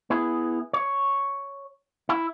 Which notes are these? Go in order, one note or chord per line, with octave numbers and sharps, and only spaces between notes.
B3 E4 G#4
C#5
E4